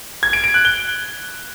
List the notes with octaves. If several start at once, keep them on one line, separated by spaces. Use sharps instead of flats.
G#6
D7
D7
F#6
G7